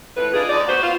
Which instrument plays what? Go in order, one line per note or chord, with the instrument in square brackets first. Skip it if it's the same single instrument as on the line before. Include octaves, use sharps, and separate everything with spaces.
[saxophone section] F2 A2 B4
D4 D#4 F4 G#4
D2 D#4 D5
B3 F#4 C5
F4